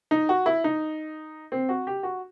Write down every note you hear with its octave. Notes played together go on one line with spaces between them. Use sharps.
D#4
F#4
E4
D#4
C4
F#4
G4
F#4